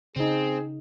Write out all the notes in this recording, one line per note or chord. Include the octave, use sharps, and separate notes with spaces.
C#3 C4 D#4 G#4